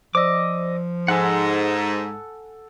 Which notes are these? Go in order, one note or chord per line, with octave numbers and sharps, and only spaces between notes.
F3 C5 D5 D#5 D6 E6
G#2 A4 F#5 G#5 F#6